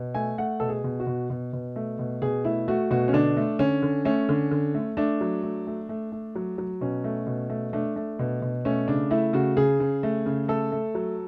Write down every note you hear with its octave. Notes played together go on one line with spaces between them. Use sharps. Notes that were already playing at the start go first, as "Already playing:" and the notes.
Already playing: B2
A3 G#5
A3 F#5
B2 A4
G#4
B2
F#4
B2
B2
B2
A3
B2
B2 G#4
A3 E4
A3 F#4
B2 F#4
C#4
D3 D4
A3
D3 C#4
D3
A3 C#4
D3
D3
A3
A3 D4
F#3
A3
A3
A3
A3
F#3
F#3
B2 C#4
A3
B2
A3
A3 D4
A3
B2
B2
A3 C#4
C#3 D4
A3 E4
C#3 F#4
C#3 G#4
C#3
A3
C#3
A3 A4
A3
F#3